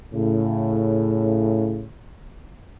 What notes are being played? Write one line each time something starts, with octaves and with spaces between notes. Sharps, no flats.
A2 C#3